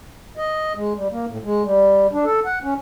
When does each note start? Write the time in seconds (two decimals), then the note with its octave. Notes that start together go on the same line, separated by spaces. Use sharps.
0.37 D#5
0.76 G#3
0.95 G3
1.11 A#3
1.28 A2
1.44 G#3
1.64 G3
2.13 D4
2.25 A4
2.45 F#5
2.63 C#4